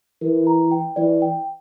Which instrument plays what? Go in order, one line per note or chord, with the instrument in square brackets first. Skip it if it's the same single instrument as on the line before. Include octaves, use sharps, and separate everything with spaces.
[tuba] E3 [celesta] A#4
[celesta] A#5
G5
[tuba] E3 [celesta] D5
[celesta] G5